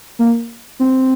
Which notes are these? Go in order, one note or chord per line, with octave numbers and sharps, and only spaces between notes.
A#3
C4